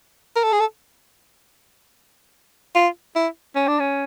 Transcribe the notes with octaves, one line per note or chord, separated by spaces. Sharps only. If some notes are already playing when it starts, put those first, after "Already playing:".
A#4
A4
G#4
A4
F4
E4
C#4
D4
C#4